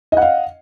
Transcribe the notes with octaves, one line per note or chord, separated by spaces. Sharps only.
D#5 F5 F#5